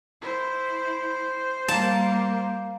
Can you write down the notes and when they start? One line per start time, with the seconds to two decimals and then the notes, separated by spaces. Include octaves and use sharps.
0.22 E4 C5
1.68 G3 A#3 F5 A5 A#5